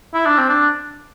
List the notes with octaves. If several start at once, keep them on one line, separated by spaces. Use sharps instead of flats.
E4
D4
C4
D4